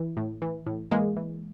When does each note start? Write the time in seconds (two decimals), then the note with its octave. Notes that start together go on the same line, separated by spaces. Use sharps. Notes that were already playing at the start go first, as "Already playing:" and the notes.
Already playing: E3
0.17 A2
0.42 E3
0.66 A2
0.91 E3 G#3 A#3
1.17 E3